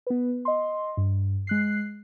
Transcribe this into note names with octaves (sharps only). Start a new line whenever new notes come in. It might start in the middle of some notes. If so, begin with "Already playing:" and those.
B3 B4
D#5 C6
G2
G#3 F#6 C7